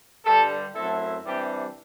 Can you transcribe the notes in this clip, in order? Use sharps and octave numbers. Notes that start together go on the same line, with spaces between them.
G2 D3 G3 A4
F#2 F#3 A3 C4 E4 A4
C3 E3 G3 D4 G4